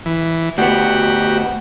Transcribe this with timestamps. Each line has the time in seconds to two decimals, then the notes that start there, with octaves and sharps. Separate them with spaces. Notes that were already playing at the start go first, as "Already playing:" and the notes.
0.06 E3
0.58 D2 B3 F#4 G4